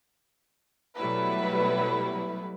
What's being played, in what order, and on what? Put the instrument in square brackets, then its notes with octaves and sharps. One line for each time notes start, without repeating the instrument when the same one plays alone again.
[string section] B2 F#3 G3 A3 E4 B4